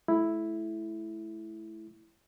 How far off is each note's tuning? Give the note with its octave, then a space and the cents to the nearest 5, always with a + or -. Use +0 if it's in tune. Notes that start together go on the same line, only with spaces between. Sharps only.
A3 -30 E4 +0